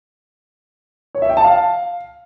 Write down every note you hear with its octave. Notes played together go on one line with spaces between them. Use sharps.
C#5
E5
G5
A5
F5